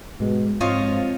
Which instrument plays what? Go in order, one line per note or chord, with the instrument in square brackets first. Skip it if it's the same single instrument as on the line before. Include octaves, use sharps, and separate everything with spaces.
[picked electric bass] G#2 G#3 [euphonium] B2
[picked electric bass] G#2 [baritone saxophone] F3 [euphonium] C4 [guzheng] F4 C#5 D#5